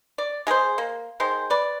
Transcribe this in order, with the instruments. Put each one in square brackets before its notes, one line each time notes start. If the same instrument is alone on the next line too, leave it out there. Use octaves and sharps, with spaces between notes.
[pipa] D5
G#3 G#4 A#4 C5
A#3
D#3 G#3 C5
B4 D5